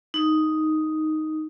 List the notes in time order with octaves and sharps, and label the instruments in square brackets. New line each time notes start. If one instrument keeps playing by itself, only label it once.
[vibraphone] D#4